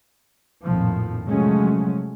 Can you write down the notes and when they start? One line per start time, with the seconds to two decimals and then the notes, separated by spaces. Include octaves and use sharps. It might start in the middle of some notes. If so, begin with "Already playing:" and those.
0.64 A#1 F2 A2 D#3 F3
1.27 C3 F3 F#3 G#3 A3 C#4